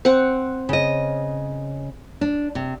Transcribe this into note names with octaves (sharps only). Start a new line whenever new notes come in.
C4 F#5
C#3 D#5
D4
C3